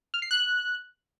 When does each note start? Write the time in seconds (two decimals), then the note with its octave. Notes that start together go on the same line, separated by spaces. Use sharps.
0.14 F6
0.22 C7
0.31 F#6